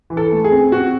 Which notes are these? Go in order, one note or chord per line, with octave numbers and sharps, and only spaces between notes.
E3
A4
A3
G#4
C4
C4 F#4